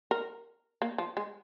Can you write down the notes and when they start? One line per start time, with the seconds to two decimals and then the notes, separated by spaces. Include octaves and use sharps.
0.11 A#4
0.82 A#3
0.98 F3
1.17 G#3